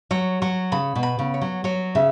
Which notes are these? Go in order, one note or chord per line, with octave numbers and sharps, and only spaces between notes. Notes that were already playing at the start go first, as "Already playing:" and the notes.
F#3 C#5
F#3 C#6
C#3 B5
B2
B5
C#3
C#5
F#3
F#3 C#5
C#3 E5